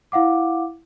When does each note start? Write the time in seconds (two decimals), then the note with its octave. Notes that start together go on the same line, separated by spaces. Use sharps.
0.12 E4 F5 F#5 D6